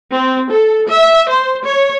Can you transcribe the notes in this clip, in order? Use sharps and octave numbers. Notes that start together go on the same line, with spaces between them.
C4
A4
E5
C5
C#5